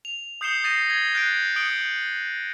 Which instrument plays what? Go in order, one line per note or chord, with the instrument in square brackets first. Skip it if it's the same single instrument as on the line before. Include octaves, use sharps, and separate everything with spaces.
[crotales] F7
D#6 G6 C7 C#7 E7 G7
D#6 A6 A#6 C7 D#7 E7
G#6 A#6 G7
F#6 G6 A6 B6 C7 D7
D#6 G6 C#7 D7 F#7 G7